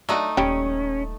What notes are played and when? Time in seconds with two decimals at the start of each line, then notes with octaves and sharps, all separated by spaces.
0.09 F#3 A3 D4 D#4 F#4
0.37 D#1 G3 C#4 G4 G5